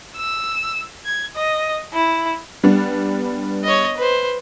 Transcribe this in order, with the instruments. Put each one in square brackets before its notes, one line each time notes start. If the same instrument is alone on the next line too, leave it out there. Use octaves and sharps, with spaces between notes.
[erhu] E6
G#6
D#5
E4
[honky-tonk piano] G3 B3 D4
[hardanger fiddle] C#5 D#5
B4 C5